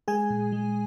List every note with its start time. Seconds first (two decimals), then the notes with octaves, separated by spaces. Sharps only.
0.08 G#3 G#4 G#5
0.30 A#2
0.52 G#3